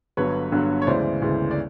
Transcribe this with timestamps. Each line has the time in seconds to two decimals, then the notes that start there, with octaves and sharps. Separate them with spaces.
0.17 G1 G2 D3 F#3 B4 C#5
0.52 G1 G2 D3 F#3
0.82 C#5
0.87 D2 C#3 E3 G#3 C5 D5
1.22 D2 C#3 E3 G#3
1.51 D5